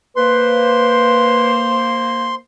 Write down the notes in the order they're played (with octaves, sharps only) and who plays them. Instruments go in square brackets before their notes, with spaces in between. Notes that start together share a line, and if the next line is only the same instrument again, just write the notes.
[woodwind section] A#3 C5 [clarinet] B4 [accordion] C6